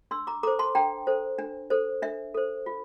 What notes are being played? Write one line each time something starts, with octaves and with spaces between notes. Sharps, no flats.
D4 C6 E6
A#5 D6
A4 C5 A#5 D6
A5 C6
D4 G5 A#5
A4 C5
D4
A4 C5
D4 E5
A4 C5
F4